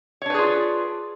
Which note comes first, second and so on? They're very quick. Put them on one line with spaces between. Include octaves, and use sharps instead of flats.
C#5 D4 B4 G#4 F4